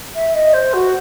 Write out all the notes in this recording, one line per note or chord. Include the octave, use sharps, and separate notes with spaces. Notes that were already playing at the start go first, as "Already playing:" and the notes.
E5
D#5
C5
F#4